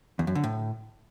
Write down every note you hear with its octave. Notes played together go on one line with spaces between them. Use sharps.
E2
F#2
D3
A2